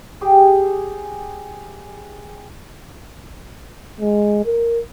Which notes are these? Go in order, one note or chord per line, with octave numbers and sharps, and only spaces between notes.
G4 G#4
G#3
A#4